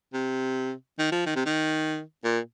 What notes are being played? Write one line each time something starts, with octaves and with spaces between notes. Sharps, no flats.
C3
D#3
F3
D#3
C3
D#3
A#2